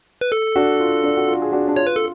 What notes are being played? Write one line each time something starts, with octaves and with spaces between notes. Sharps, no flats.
B4
A4
D4 F#4
F4
D4
F#4
F4
G#4
D4 F#4
D4
F4 C#5
B4
A4